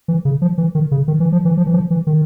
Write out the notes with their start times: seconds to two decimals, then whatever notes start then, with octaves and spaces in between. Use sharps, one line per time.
0.08 E3
0.25 C#3
0.42 F3
0.58 E3
0.75 D#3
0.91 C#3
1.08 D#3
1.20 E3
1.32 F3
1.45 E3
1.57 F3
1.66 E3
1.74 F3
1.91 E3
2.07 D#3